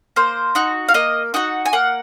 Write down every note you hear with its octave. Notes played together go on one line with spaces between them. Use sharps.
A#3 C5
D#4 F#4
F5
A#3 D#5
D#4 F#4 F#5
G#5
A#3 F#5